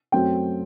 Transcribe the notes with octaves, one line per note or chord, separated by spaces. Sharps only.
F#2 F#3 A3 C4 G5